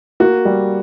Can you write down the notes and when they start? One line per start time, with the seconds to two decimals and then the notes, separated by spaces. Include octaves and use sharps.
0.20 A#3 F#4
0.45 G3